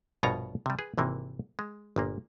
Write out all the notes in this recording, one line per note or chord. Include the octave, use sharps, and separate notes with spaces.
A#1 G2 B2 F4 C#5 A#5
C3 G3
G#4 B4
G#1 C3 E3 A#3
G#3
G1 A#2 A#3